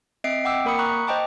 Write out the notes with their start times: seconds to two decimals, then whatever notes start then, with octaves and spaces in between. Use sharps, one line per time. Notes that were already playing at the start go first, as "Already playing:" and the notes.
0.24 C4 D#5 E5 C7 D7
0.45 F#5 G5 D6 E6
0.65 A#3 A#4 B5 D#6 C#7
0.78 A#5 B5 C#6 F#6
1.07 C5 D#5 G5 A5 D6